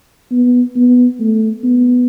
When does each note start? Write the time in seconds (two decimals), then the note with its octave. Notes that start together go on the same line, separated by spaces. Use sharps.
0.32 B3
0.76 B3
1.20 A3
1.64 B3